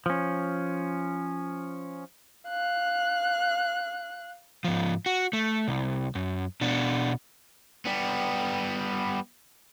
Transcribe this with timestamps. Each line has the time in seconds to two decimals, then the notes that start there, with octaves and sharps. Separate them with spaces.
0.06 F3 C#4
2.49 F5 F#6
4.64 G#2 F3
5.06 F#4
5.33 A3
5.68 C2
6.15 F#2
6.61 B2 D4
7.85 G3 B3